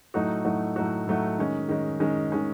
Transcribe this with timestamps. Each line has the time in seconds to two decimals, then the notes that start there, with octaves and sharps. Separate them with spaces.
0.14 A2 F#3 A3 D#4 F#4
0.45 A2 F#3 A3 D#4 F#4
0.76 A2 F#3 A3 D#4 F#4
1.08 A2 F#3 A3 D#4 F#4
1.38 D#3 G#3 C#4
1.69 D#3 G#3 C#4
2.00 D#3 G#3 C#4
2.32 D#3 G#3 C#4